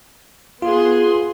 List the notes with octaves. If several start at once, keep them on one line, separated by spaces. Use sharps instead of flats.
B3 F4 G#4 C6